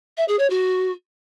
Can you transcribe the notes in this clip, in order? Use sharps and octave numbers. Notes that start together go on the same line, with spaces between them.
E5
G#4
C#5
F#4